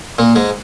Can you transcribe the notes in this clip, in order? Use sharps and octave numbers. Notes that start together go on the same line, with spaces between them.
A#2 A#3
G#2 G#3